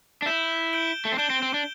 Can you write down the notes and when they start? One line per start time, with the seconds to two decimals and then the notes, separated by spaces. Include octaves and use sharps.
0.22 D4
0.26 E4 G6 E7 G7
0.73 G6 D7 G7
1.05 A3
1.12 C4
1.18 D4 G6 E7 G7
1.30 C4
1.42 C4
1.54 D4